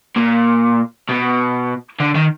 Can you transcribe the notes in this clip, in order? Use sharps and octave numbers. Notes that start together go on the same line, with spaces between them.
A#2
B2
D3
D#3